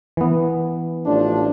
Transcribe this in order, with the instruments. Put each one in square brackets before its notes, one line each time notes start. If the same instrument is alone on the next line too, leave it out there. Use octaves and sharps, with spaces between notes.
[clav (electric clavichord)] E3 B3
[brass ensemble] A1 F3 D4